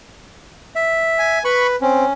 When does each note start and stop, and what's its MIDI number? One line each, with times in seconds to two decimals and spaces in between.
0.75 1.39 76
1.19 1.43 80
1.45 1.76 71
1.45 1.67 83
1.45 1.67 85
1.81 2.05 60
1.81 2.13 61